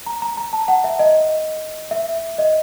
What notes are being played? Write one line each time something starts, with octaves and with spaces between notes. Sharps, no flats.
A#5
A#5
A#5
A5
F#5
E5
D#5
E5
D#5